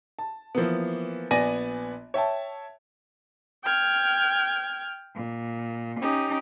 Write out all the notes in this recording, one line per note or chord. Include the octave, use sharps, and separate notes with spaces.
A5
E3 F3 A#3 B3
A#1 B3 D5 G#5 A#6 D#7
C#5 E5 G5 A5
G5 F6 G#6
A#2
C#4 D#4 G4